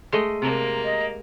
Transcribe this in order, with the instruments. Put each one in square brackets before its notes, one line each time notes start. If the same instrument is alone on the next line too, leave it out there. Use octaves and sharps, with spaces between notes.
[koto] G#3 A3 D#5
[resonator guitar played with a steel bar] C3 [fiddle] A#3 A#5
[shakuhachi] D#5